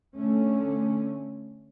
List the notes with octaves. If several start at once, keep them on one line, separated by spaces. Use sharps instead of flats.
D3 A3 C#4